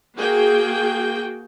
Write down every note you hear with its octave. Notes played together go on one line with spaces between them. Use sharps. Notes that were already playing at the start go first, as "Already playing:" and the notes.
A#3 F#4 G#4 G5